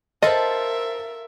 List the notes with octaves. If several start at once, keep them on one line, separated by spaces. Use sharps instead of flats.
F4 A4 A#4 C5 D#5 E5 B5 A6